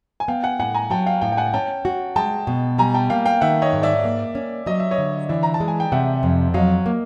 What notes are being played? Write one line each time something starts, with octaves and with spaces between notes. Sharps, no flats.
G#5
B3 F5 G5
F#5 G#5
A2 F#5 G#5
G#5 A#5
F#3 G5 A5
F5 G5
A2 F5 G5
G5
F#5 G#5
C#4 G5 A5
F#4
G#3 G5 A5
B2
G3 G#5 A#5
G5 A5
A#3 F5 G5
F5 G5
D#3 E5 F#5
C#5 D#5
G#2
D5 E5
A#3
C#4
F#3 D#5
E5
C#5 D#5
D3
E3 D5 E5
A#5
A5
G#3
G#5
G5
C3 E5 F#5
F2
F#3 D#5 F5
A#3